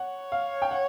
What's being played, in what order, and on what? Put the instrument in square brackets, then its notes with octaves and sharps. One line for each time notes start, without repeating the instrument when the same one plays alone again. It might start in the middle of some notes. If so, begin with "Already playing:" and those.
Already playing: [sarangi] C#5 [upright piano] F#5
[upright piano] F5
G5
F#5